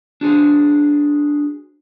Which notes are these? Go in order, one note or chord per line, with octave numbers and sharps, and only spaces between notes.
D4 F#4 G#4 C5